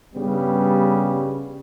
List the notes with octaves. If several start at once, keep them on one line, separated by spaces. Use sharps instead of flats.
G2 C#3 G3 B3